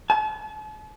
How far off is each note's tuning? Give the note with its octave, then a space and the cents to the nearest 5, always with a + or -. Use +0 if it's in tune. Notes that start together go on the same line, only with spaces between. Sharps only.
A5 -45